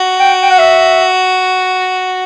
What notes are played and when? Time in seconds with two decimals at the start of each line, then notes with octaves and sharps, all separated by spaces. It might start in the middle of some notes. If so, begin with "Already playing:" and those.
Already playing: F#4
0.20 G5
0.43 G5
0.51 F#5
0.59 E5